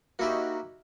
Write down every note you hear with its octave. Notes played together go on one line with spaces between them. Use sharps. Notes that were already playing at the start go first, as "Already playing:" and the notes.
A#3 D#4 E4 F#4 G4